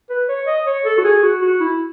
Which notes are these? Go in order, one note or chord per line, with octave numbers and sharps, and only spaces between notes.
B4
C#5
D#5
C#5
A4
F#4
G#4
F#4
F#4
E4